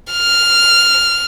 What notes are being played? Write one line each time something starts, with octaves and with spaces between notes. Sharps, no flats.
F6